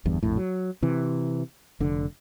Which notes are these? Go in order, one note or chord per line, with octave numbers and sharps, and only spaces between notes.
G1 E2 G2
A#1 F2 A2
F#3
C3 E3
F1 D3